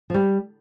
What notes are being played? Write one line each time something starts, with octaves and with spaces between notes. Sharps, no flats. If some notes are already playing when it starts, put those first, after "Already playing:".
F3
G3